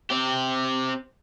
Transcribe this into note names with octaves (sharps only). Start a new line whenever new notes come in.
C4 G4